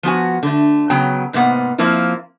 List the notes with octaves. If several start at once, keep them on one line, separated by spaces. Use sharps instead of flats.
F3 B3 F#4 G#5
D3 A3
C#3 F#3 B3 G5 A#5
G#2 C3 A#3 B3 F#5
F3 A#3 C4 E4 F4